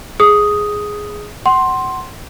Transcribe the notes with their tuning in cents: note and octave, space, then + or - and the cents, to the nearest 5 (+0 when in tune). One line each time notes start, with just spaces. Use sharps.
G#4 +0 D#6 +0
F#5 +25 C6 +10